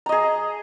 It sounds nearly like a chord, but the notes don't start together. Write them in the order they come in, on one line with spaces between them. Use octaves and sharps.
A#5 D#5 G#4